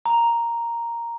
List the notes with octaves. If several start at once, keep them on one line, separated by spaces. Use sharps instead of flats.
A#5